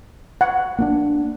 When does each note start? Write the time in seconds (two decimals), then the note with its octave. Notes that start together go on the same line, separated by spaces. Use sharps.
0.41 F#5
0.79 A#3 C#4 D4